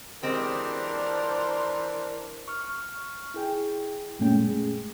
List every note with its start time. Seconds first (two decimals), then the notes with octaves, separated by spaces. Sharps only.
0.23 E3 G#3 C4 D4 G4 A#4 C5
2.48 C#6 F6
3.34 E4 G#4 G5
4.19 F#2 A#2 G#3 A3 C#4 G5
4.44 G#4